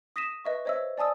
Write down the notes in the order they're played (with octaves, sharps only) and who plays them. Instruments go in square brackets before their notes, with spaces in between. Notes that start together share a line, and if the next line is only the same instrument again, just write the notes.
[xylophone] D#6 A#6 B6 D#7 E7
B4 D#5 E5 C#6
C5 C#5 D#5 E5 E6
D5 G#5 A5 D#6 E6